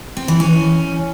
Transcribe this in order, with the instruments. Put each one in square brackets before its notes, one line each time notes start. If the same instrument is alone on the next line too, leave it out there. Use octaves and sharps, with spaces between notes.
[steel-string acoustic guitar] C4
E3
C#4